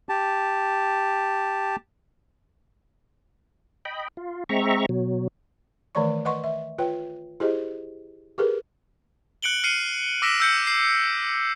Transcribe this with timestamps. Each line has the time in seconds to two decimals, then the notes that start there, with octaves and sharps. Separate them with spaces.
0.09 G4 A5
3.85 D#5 G5 B5
4.17 F4
4.49 G#3 C4 E5 A#5 C#6
4.89 B2 F#3
5.95 D#3 E3 A3 C#5 D5 C#6
6.25 B4 D#5 F#5 C6 C#6
6.44 E5
6.78 F4 B4 C#5 G5
7.40 E4 G4 G#4 C5 D#5
8.38 G4 G#4 A#4 B4
9.42 F#6 C#7 D7 F#7 G7
9.64 F6 C7 C#7 D#7
10.22 D6 E6 A#6 B6 D7 E7
10.40 E6 G6 C#7
10.67 C7